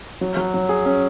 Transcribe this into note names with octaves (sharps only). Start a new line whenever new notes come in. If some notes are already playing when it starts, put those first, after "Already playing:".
F#3
F#3
F#3
G#4
C#4